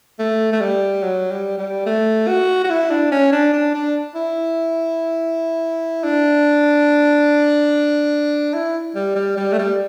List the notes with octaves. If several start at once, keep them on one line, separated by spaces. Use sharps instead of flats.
A3
A3
G3
F#3
G3
G3
A3
F#4
F#4
E4
D4
C#4
D4
D4
D4
E4
D4
E4
G3
G3
G3
A3
G3